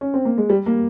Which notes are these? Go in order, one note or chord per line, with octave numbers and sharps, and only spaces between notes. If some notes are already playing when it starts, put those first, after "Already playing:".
C#4
C4
A#3
G#3
G3
A#3